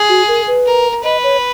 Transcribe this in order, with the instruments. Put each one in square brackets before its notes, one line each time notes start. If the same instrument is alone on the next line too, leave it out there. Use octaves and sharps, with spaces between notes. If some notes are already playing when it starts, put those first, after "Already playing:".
Already playing: [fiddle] G#4
[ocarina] F#4
A#4
B4
[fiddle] A#4
[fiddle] B4 [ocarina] D#5
[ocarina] C#5